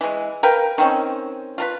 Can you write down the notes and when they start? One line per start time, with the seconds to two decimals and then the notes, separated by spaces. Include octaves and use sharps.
0.01 E3 G#3
0.43 A#4 B4 F5 G5
0.78 D#3 C4 C#4
1.58 F4 A#4 B4